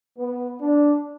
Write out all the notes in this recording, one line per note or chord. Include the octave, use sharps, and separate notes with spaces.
B3
D4